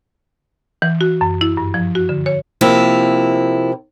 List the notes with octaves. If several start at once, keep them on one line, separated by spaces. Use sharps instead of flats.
E3
F#4
F#2
E4
G2
F3
F#4
D3
C#5
C3 F3 A#3 E4